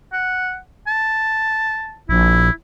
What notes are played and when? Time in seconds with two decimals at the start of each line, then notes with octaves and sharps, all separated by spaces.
0.13 F#5
0.87 A5
2.09 A#1 E4